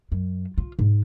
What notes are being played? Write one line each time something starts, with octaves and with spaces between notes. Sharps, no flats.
F#2
F4
G#2